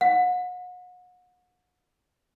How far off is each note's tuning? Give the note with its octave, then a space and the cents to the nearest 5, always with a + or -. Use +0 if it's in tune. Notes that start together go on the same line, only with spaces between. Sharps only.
F#5 -35